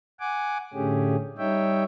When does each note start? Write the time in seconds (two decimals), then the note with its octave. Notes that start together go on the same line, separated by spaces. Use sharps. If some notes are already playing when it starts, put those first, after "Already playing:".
0.20 F#5 G#5 D6
0.74 A2 D3 A3 C#4 G4 G#4
1.38 G3 D#4 C#5 E5 G5